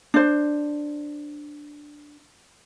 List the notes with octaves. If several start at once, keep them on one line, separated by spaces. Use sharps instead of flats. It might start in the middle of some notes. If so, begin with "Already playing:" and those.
D4 C5